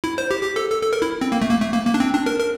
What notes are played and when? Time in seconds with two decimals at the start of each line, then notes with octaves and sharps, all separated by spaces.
0.04 E4
0.18 C5
0.31 G4
0.43 G4
0.56 A4
0.70 A4
0.82 A4
0.93 A#4
1.02 E4
1.21 C4
1.32 A#3
1.42 A3
1.51 A#3
1.62 A3
1.74 A#3
1.87 A#3
1.94 D4
2.00 C4
2.14 D4
2.26 A#4
2.39 A#4